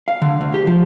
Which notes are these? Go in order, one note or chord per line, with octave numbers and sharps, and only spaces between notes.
F5
D3
D2
G4
F3